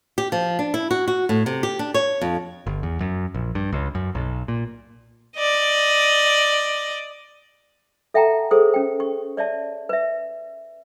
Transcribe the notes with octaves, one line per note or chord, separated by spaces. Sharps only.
G4
F3
D4
E4
F#4
F#4
A2
C3
G4
D4
C#5
F2
G1
E2
F#2
A#1
G2
C#2
F#2
B1
A#2
D5 D#5
A4 E5 F#5 G5 A5 A#5
G#4 A4 C5 D#6
C#4 G5
C#6
C#5 D5 E5 A5
B4 E5